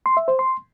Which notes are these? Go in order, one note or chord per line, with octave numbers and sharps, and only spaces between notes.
C6
E5
C5
C6